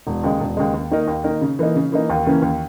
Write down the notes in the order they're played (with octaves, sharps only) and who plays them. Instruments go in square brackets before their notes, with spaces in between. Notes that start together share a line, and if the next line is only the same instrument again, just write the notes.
[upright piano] E1
D#2 C#3 G#3
E1
D#2 C#3 G#3
D#2
D#3 A#3 D#4 A#4
D#2
D#3 A#3 D#4 A#4
C#3
E3 A#3 D#4
C#3
E3 A#3 D#4
D#2
C#3 E3 A#3 C#4
D#2